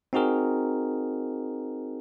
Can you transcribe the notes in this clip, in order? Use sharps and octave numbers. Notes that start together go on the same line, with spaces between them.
C4 D#4 F#4 G#4 A#4